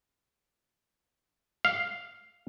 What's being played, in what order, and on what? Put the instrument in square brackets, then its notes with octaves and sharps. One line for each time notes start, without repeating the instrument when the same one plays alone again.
[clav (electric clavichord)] F5